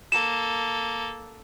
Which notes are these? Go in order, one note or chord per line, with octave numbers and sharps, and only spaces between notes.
A#3 A4 E7